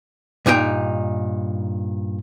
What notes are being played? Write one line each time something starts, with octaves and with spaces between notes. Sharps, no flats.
G2 A#2 D#4 A4 G5